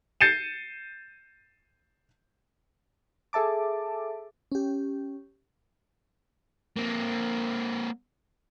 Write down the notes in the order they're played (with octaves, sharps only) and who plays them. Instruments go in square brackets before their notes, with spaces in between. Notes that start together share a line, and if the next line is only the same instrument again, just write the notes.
[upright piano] G6 A6 C7 C#7 D#7 E7
[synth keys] G#4 A4 E5 A5 D6
[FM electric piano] C#4 G4
[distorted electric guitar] A#3 C4